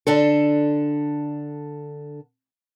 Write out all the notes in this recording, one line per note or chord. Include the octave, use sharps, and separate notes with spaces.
D3 D4 A4